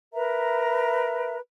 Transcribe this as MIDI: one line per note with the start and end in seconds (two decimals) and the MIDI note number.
0.13 1.38 70
0.13 1.38 71
0.13 1.38 76
0.13 1.38 82